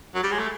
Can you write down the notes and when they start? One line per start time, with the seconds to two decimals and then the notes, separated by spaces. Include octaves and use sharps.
0.15 F#3
0.23 G3
0.32 G#3
0.39 A3